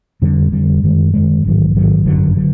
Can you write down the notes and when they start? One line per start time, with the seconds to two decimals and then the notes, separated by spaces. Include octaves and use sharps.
0.22 F2 D3 G3
0.52 F2 D3 G3
0.83 F#2 D#3 G#3
1.13 F#2 D#3 G#3
1.44 A1 G#2 D#3 F#3
1.75 A1 G#2 D#3 F#3
2.05 G1 F#2 D3 F#3
2.36 D3 F#3